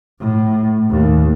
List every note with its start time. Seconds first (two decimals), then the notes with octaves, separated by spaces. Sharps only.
0.20 A2
0.90 D#2